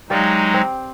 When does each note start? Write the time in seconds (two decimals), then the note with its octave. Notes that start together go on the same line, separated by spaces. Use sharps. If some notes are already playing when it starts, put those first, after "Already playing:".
0.10 F#3 G#3 D#4 G4 D5 F5
0.54 C4